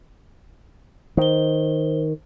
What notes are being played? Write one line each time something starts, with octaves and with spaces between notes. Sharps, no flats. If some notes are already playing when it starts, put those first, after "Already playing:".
D#3 C5 G7